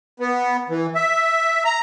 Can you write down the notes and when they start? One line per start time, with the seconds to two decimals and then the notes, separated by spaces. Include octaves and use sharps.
0.20 B3
0.69 E3
0.95 E5
1.65 A#5